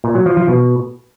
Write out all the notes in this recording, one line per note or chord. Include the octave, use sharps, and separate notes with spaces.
A#2
F#3
F3
F3
B2